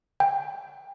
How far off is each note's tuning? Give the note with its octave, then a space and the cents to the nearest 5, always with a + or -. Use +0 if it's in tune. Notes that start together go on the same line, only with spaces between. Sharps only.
G5 +5